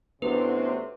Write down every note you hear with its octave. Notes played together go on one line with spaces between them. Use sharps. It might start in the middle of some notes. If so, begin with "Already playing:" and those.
A1 C3 B3 D4 F#4 B4 C6